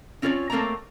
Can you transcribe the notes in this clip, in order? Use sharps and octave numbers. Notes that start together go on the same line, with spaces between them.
C4 C#4 F4 A#4 C#5 D5
A3 A#3 C4 C#5 D5 A#5